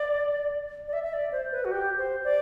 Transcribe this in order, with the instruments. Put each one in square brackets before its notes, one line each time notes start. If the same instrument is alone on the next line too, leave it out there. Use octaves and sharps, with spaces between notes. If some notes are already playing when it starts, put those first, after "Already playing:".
Already playing: [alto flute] D5
D5
E5
E5
D5
C5
B4
F#4
G4
C5
D5